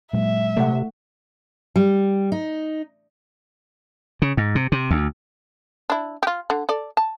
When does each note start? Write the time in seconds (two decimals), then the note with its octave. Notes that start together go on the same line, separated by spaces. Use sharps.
0.13 A#2 F#3 G#3 E5
0.57 C3 A3 F#5
1.76 G3
2.32 D#4
4.22 C#3
4.37 G#2
4.55 C3
4.72 C3
4.91 D2
5.90 D4 E4
6.23 F4 G4
6.50 D3
6.69 A4 D5
6.97 A5